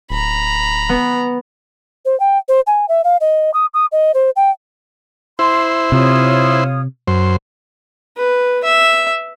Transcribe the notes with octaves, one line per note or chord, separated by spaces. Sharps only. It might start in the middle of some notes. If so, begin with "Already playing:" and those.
D1 A#5 B5
B3
C5
G5
C5
G#5
E5
F5
D#5
D#6
D#6
D#5
C5
G5
E4 C5 C6
C3 F4 C#5 D#6
F#2 C5
B4
E5